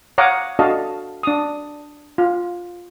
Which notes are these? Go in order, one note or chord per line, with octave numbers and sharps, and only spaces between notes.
C#5 F5 F#5 A#5 D6 D#6
D4 F#4 A4 D#5 F5 A5
D4 D#6
F4